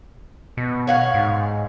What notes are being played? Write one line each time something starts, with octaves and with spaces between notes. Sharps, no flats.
B2
C#5 F5 F#5
G#2